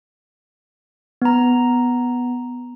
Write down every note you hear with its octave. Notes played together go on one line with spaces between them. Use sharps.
B3 A#5